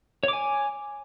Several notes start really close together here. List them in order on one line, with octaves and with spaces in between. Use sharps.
C#5 D6 G#5